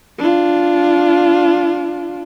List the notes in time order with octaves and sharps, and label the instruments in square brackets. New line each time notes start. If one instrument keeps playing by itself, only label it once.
[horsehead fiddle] D4 F4